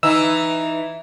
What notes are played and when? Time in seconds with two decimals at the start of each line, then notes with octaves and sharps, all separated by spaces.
0.03 E3 D#4 E6